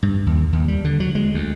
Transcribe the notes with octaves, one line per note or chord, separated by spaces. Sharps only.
G2
D#2
D#2
G3
D3
F#3
G#3
D2